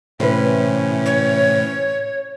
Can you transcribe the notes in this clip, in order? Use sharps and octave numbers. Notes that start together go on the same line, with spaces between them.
A2 C3 E3 C#4 B4
C#5